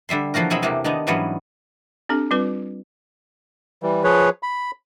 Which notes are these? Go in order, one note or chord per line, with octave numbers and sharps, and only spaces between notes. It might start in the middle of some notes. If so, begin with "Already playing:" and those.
D3 G3 E5 C6
E3 F3 A#3 F#4 A#4
B2 F#3 C4 G#4 E5 B5
E2 C3 E3 A3 A#3 G4
D#3 B3 D4 D#4
G#2 E3 F#3 G3 B3 C#4
C4 D4 G4 A4
G3 C4 F4 B4
E3 G3
F3 G#4 B4 C#5
B5